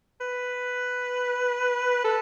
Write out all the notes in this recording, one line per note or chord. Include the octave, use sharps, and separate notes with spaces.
B4
A4